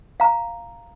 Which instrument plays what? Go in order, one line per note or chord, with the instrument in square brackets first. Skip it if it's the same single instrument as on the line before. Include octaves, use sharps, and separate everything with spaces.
[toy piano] F5 A#5